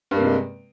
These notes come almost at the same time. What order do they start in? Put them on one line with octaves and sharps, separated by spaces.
G2 A#3 C3 G#3